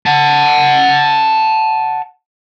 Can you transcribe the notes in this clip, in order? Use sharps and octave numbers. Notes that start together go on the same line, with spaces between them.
F#5 A5